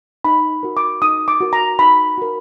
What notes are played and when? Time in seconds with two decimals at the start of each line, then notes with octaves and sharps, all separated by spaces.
0.25 D#4 B5
0.63 F#4 A#4
0.77 D6
1.02 D#4 D#6
1.28 D6
1.41 F#4 A#4
1.53 A#5
1.79 D#4 B5
2.18 F#4 A#4